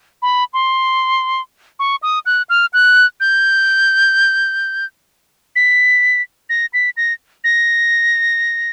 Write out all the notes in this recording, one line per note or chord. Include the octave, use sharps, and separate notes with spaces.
B5
C6
C#6
D#6
F#6
F6
F#6
G6
B6
A#6
B6
A#6
A#6